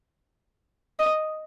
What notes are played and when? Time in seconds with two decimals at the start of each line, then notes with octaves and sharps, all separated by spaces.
0.99 D#5